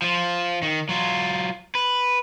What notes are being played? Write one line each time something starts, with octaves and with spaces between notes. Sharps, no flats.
F3 F4
D#3
F#3 F4
B4